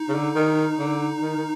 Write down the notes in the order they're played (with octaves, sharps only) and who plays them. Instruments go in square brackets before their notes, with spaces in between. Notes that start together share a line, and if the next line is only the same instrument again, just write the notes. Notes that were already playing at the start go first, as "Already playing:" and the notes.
Already playing: [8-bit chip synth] D#4
[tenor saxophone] C#3
D3
D#3
D3
D#3
D#3